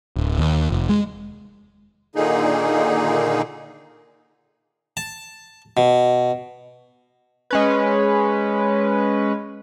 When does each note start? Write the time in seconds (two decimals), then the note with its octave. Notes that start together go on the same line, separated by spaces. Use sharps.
0.16 D1
0.38 D#2
0.70 F1
0.89 G#3
2.15 A#2 D3 D#3 A#3 D#4 G#4
4.97 A5
5.77 B2
7.51 G#3 C#4 B4